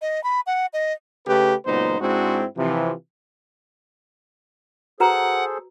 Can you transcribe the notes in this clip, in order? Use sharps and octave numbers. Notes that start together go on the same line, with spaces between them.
D#5
B5
F#5
D#5
C#3 A3 G4 B4
C#2 A#2 F#3 B3 D#4 C5
G#2 G#3 C4 D4 E4 F#4
C3 E3 F3
F#4 G#4 A4 B4 C5 F#5 A#5